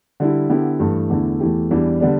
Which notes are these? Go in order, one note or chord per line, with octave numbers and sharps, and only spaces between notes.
D3 G3 E4
D3 B3 E4 G4
G2 E3 A3
E2 D3 A3 E4
E2 E3 A3 G4
E2 E3 G3 D4
D3 G3 B3 D4